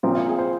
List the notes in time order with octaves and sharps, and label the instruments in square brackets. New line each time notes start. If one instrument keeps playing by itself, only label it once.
[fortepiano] A#2 F3 C4 [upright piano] F4
[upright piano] F4
G#4
C5